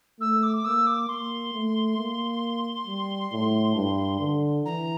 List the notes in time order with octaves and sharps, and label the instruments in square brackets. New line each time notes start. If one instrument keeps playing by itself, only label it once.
[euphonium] A3 [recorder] E6
[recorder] D6
D6
[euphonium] A#3 [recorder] E6
[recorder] D6
[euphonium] A#3 [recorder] C6
[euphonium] A3
A#3
G3
A2
G2
D3
[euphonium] E3 [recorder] A#5